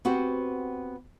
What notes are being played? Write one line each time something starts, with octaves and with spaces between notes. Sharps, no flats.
B3 C4 F#4 G4 C5